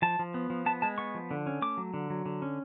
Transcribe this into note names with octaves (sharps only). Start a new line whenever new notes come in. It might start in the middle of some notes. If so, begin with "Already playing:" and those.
F3 A5
F3
B3
F3
B3 A5
G#3 A5
B3 C#6
F3
D3
C#4
A3 D6
F#3
D3
F#3
D3
C#4